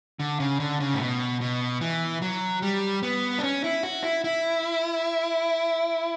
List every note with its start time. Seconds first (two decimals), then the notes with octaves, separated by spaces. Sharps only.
0.20 D3
0.40 C#3
0.60 D3
0.80 C#3
0.94 A2
1.00 B2
1.41 B2
1.81 E3
2.22 F#3
2.62 G3
3.03 B3
3.39 D4
3.43 C#4
3.64 E4
3.83 F#4
4.03 E4
4.24 E4